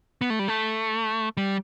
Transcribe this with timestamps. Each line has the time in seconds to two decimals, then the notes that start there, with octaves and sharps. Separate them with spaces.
0.21 B3
0.30 A3
0.39 G3
0.48 A3
1.37 G3